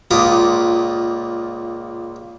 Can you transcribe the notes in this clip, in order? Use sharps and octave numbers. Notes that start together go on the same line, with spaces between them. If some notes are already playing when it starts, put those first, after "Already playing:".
C#2 A#2 F4 D6 D#6